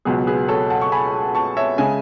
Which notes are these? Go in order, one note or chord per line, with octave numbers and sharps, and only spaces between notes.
C#2 B2 F#3 B3 G#4
G#4 B4
A4 C#5
F#5 A5
C#6
G#5 B5
A5 C#6
C#5 E5
C#3 G#3 E5 G#5